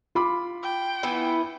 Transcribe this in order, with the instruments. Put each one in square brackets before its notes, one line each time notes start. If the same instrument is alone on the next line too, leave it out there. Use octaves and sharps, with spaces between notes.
[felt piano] F4 B5 D6
[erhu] G5
[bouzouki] E3 B3 E4